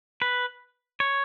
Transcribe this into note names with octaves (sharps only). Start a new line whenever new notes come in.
B4
C#5